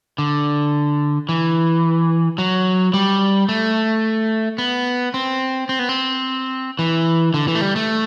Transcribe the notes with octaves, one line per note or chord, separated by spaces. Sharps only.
D3
E3
F#3
G3
A3
B3
C4
C4
B3
C4
E3
D3
E3
A3
G3
A3